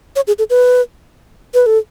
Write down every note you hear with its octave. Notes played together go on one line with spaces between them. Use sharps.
C#5
G#4
A4
B4
B4
A4